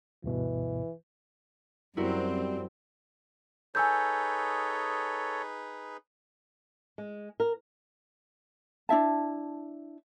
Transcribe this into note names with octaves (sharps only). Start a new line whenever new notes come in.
D2 G2 B2 E3
F#2 G3 C4 E4 F#4 A#4
D#4 G#4 A4 B4 C#5 G#5 E6 G6
G#3
A#4
D4 E4 E5 A5